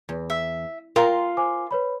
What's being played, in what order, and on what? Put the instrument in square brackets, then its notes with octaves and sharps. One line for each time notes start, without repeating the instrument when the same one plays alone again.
[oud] E2
[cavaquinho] E5
[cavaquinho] F4 C6 [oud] A#4 [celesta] G5
[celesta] C5 G#5 D6
B4 C#5 B5